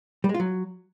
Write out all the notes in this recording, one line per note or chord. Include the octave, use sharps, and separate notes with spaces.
G3
G#3
F4
F#3